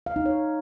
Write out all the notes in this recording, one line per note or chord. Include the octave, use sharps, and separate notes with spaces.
F5
D#4
C#5